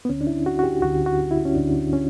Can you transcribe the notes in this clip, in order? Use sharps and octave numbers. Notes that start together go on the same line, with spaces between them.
B3
D2 D3 C#4
D4
E4
F#4
F#4
G4
D2 D3 F#4
F#4
E4
C#4
D2 D3 D4
C#4